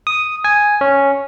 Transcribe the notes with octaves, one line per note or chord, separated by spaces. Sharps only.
D#6
G#5
C#4